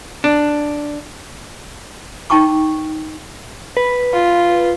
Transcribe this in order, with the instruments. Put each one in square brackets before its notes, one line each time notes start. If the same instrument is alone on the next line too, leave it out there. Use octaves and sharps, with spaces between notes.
[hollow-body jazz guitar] D4
[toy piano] D#4 G5 A5 C#6 D6
[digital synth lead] B4
[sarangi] F4